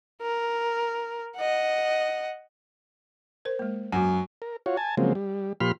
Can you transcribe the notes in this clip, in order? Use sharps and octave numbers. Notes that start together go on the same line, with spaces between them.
A#4
D#5 F#5
A#4 C5
G#3 A#3
F#2 F#4 F#5
A#4
F4 F#4 C#5
G#5 A5
C#3 F3 F#3 G#3 A#3 C4
G3
A#2 F3 G4 B5 C6 F6